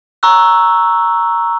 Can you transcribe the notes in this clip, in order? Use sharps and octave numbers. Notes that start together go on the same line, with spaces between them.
A#5 C#6 E6 F#6